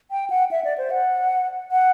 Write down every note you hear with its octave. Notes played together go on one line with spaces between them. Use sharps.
G5
F#5
E5
D5
C5
F#5
F#5